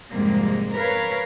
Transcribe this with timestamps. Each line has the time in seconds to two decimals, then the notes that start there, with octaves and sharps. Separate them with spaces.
0.12 F2 G#2 C3 G3 G#3 A#3
0.74 A#4 B4 C#5 F5